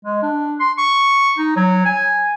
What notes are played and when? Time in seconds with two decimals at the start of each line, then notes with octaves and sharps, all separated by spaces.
0.04 G#3
0.22 D4
0.60 C6
0.78 C#6
1.38 D#4
1.56 F#3
1.86 G#5